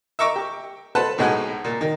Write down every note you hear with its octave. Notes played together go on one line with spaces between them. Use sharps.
E5 A#5 C#6 D6 E6
G4
A4 B4 C5 F#5 A5
B1 A2 G#3 F#4 F#5 G#5
A#2
D#3